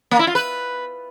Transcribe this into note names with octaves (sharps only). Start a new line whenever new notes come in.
A#3
E4
F4
B4